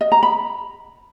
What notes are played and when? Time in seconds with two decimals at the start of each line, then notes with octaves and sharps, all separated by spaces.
0.01 D#5
0.12 A#5
0.23 B5